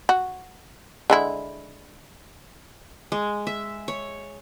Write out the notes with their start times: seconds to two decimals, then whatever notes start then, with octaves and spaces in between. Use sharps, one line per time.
0.09 F#4
1.10 D3 G#3 E4
3.12 G#3
3.47 E5
3.88 C#5